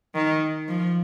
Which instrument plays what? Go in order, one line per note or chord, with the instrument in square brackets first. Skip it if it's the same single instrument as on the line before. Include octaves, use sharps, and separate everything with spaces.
[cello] D#3
F3